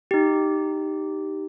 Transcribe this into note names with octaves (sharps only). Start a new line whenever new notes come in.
D#4 G4